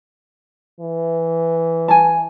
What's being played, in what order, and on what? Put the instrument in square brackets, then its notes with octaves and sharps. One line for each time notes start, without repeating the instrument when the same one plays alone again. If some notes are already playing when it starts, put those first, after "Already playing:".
[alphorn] E3
[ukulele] G#5 A5